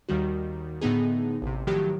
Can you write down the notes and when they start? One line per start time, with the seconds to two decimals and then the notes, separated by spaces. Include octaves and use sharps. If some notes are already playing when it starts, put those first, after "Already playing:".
0.09 D#2 D#3 G3 F#4
0.81 A2 D3 B3 D#4 G#4
1.42 A1 C3
1.67 A2 D#3 F3 F#3 G4